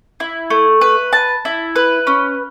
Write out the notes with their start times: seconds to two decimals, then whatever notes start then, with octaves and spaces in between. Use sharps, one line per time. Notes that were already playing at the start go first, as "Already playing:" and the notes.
0.20 E4
0.50 A3
0.81 B4
1.13 A5
1.45 E4
1.76 B4
2.07 C#4